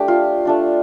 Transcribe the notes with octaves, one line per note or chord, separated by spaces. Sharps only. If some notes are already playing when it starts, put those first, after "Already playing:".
Already playing: A3 D4 G4
F4
A3 D4 F4